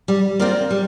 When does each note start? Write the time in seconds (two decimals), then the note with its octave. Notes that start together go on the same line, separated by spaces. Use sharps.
0.08 G3
0.39 C4 F4 A#4 D5
0.71 G3